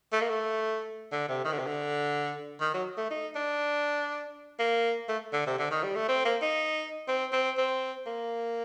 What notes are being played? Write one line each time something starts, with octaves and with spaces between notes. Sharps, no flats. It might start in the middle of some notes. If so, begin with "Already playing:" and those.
A3
A#3
A3
D3
C3
D#3
D3
C3
D3
D#3
F#3
A3
D#4
D4
A#3
A3
D3
C3
D3
D#3
G3
A3
C4
A#3
D#4
C4
C4
C4
A#3